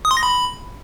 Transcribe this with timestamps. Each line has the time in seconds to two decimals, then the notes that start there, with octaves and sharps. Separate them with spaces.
0.05 D#6
0.11 C6
0.17 A#6
0.23 B5